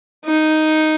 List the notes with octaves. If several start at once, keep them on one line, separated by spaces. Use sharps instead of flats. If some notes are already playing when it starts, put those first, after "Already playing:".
D#4